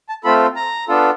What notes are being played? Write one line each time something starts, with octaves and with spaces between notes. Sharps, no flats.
A5
A3 C4 F4 A4 B5
A#5
B3 D4 F4 A4